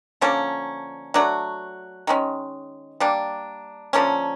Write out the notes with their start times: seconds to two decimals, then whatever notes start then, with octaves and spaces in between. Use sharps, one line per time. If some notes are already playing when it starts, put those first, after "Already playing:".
0.21 D3 F3 A#3 C#4
1.14 F#3 A3 D4 F#4
2.07 D#3 G#3 C#4
3.00 G3 A#3 D4
3.93 D3 F3 A#3 C#4